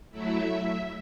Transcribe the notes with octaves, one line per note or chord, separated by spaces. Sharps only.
F#3 A3 E4 E5